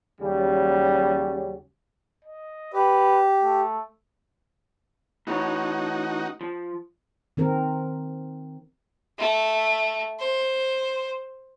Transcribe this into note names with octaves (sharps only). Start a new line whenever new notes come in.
D#2 C#3 F#3 G3 C#4
D#5
G4 B4
A3
A2 E3 D#4 F#4 C#5
F3
D#3 C4 A#4
A3
C5